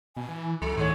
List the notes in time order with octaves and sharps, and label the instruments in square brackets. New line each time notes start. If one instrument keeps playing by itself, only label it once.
[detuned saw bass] B2 [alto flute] G#5
[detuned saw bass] E3
[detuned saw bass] C#2 [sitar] F#3 [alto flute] A4
[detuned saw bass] A2 [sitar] D#3 G#3 C#5